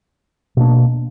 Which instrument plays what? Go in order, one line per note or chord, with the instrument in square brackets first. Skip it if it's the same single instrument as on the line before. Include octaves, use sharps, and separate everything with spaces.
[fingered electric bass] B2 A#3 D4